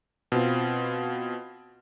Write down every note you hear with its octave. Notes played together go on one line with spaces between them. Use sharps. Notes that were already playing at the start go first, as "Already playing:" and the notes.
B2 C4 F4